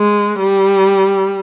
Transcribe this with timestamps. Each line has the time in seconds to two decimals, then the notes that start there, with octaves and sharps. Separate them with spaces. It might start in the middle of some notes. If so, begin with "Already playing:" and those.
Already playing: G#3
0.40 G3